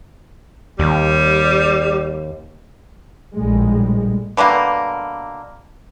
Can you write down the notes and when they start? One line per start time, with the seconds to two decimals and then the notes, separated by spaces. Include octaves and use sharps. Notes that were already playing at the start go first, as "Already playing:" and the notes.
0.79 D#2 G3
3.35 A#1 A2 G3 G#3
4.37 B2 D3 G3 A#3